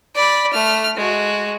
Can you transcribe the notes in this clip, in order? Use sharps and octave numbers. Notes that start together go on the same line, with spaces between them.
D5 B5
A3 F6
G#3 F#4